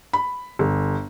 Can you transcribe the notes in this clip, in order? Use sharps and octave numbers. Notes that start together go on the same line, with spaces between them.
B5
G1